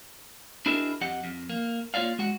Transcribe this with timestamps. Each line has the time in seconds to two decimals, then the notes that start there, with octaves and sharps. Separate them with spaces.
0.66 D4 E4 F#4 G#4 A#4 D#5
1.01 F2 G4 D#5 F#5
1.24 F2
1.50 A#3
1.94 A#3 F4 C#5 D5 F5
2.19 G#3 F#4 F#5